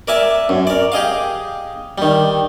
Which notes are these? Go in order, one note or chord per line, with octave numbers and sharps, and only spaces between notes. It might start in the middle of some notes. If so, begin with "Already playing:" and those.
A#4 D5 E5 G#5 A5
F#2
A#4 D5
G4 G#4 D#5 F5
D#3 G3